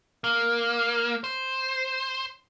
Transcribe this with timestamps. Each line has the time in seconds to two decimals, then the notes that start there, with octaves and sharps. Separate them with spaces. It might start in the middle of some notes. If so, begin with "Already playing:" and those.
0.24 A#3
1.24 C5